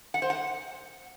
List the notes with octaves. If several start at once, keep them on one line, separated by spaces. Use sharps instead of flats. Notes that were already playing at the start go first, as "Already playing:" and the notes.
F#5
C5
F#5